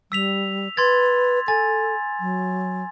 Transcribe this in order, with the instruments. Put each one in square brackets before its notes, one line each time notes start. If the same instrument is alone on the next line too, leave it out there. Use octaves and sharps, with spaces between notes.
[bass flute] G3 [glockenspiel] E6 B6 F7
[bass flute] B4 [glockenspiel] C6 G#6 A6
[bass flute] A4 [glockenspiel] G#5 A6
[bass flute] F#3